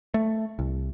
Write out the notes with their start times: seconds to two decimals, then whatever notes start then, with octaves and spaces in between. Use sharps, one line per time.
0.14 A3
0.59 C2